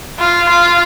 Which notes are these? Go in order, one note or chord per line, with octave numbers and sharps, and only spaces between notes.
F4
F4